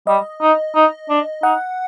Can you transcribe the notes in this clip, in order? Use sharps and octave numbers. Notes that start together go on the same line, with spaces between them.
G3 D#5
D#4
D#4
D4
D#4 F#5